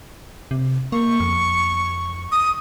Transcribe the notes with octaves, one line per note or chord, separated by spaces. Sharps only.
C3
A#3 C#6
F2
D#6